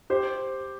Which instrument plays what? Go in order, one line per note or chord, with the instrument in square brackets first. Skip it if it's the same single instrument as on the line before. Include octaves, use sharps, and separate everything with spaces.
[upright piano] G4 C5